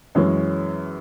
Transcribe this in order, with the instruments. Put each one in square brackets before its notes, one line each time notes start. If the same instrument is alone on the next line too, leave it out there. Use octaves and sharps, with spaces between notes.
[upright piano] F#2 E3 G#3 C#4